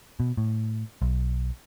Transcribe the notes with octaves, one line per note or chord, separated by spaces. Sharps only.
B2
A2
B1